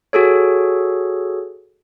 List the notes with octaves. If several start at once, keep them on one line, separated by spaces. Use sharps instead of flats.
F#4 G#4 A4 C#5